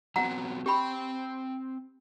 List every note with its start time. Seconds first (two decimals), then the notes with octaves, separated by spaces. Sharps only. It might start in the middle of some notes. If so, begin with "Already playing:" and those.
0.16 F#3 B3 C4 F#5 A#5
0.66 C4 G4 G5 B5